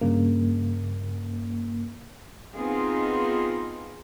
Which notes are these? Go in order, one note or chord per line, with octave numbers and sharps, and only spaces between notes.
G2 C#3 A#3
B3 C4 D#4 F4 G#4